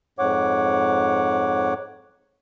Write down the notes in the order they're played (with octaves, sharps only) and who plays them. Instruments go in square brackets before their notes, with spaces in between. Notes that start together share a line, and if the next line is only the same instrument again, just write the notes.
[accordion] F2 G#2 C#5 F#5 D6